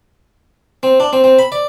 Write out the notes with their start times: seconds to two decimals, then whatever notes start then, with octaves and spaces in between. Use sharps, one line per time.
0.83 C4
1.00 D4
1.13 C4
1.24 C4
1.39 B5
1.52 D5